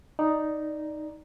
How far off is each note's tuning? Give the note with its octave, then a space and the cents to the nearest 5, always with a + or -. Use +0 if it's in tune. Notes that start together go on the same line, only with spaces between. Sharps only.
D#4 +0 D5 +5